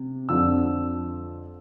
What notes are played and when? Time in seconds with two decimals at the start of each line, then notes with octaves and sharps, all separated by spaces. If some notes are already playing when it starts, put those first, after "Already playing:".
Already playing: C3
0.29 F2 D3 F3 E6